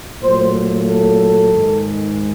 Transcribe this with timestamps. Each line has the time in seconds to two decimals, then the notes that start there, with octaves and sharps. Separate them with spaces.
0.22 A#2 F#3 A3 C5
0.86 A4
1.51 G#2 D#3 G#3